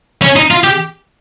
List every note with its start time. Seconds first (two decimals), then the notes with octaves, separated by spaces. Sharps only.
0.22 C#4
0.36 D#4
0.51 F4
0.64 G4